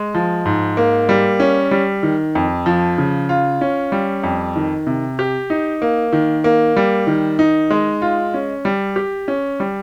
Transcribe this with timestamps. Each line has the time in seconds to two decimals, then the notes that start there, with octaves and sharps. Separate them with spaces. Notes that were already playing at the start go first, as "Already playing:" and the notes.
Already playing: G#3
0.15 F3
0.45 G#2
0.77 A#3
1.09 G3
1.40 C#4
1.71 G3
2.03 D#3
2.35 F2
2.66 F3
2.98 C#3
3.29 F4
3.61 C#4
3.92 G3
4.23 F2
4.56 D#3
4.87 C3
5.19 G4
5.50 D#4
5.82 A#3
6.13 D#3
6.44 A#3
6.77 G3
7.07 D#3
7.39 D#4
7.70 G#3
8.02 F4
8.34 C#4
8.65 G3
8.96 G4
9.28 C#4
9.60 G3